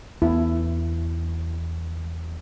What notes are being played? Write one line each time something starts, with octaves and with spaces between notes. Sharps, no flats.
E2 B3 E4